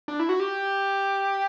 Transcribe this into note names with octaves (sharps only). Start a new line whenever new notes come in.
D4
E4
F#4
G4